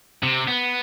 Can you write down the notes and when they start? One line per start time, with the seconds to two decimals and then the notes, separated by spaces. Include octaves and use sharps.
0.23 C3
0.48 B3